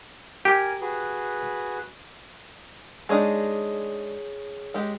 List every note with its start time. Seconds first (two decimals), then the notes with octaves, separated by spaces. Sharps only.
0.45 G4 A#4 G#5
0.81 F#4 G#4 B4
3.09 G#3 D4 D#4 G#4 C#5 D#6
4.74 G#3 G4